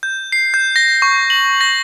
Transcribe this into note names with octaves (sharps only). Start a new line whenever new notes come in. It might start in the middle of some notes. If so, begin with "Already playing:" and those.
G6
C7
G6
A#6
C#6
F#7
A#6